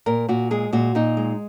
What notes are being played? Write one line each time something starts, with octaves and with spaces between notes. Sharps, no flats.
A#2 A#4
A#2 F#4
G#3 G#4
A#2 F#4
A#2 D#4
G#3